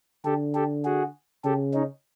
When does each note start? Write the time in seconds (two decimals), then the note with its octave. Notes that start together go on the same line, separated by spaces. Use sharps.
0.25 D3 G4 A4
0.55 G4 A4
0.85 F#4 G#4
1.44 C#3 G4 A4
1.74 C#4 D#4